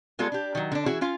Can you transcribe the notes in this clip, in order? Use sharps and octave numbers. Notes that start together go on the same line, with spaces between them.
G3 G#3 B3 F4 G#4 A4
D4 G4
D#3 F#3
D3 D4
E3 C#4 E4 F#4 G#4
C#4 F4 F5